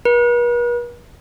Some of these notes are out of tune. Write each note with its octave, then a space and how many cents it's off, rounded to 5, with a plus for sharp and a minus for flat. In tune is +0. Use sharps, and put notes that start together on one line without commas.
B4 -45